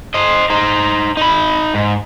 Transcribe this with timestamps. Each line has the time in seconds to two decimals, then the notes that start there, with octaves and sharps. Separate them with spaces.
0.14 C5 D#5
0.50 D#4 C5
1.17 D#4 B5
1.74 G#2